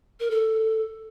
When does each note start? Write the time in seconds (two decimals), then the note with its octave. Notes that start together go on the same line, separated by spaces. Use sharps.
0.20 A#4
0.30 A4